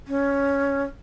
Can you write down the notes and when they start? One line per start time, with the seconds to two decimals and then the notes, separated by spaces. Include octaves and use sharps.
0.08 C#4